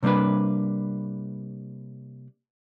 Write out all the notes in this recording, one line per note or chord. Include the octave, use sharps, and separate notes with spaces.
C3 G3 A#3 D4 B4